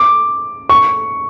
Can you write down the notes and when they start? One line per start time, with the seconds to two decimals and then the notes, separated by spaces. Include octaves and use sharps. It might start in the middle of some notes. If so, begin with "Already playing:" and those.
Already playing: D6
0.69 C#6